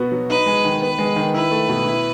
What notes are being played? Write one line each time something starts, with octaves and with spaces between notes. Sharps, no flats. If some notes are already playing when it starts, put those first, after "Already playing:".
Already playing: B2 B3 F#4
F#3
D#4 B4
G#3
D#3
B3 B4
G#3
D#3
E4 B4
A3
B2
E4